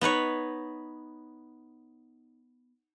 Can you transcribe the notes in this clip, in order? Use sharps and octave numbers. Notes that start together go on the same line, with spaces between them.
B3 D#4 B4 C#5